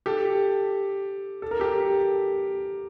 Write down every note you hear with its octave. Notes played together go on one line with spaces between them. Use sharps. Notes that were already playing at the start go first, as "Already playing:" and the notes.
G4 A4
A4
A#4
G4 A4